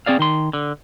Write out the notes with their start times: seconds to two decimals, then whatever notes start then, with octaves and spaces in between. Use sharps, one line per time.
0.06 C4 G#4 D5 F5
0.19 D#3 C6
0.53 D3